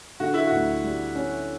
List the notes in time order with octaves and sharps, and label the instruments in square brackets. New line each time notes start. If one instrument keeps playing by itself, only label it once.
[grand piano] D3 [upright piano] F#4
[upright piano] E4
[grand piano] D2 [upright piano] F#4
[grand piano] G3
C#4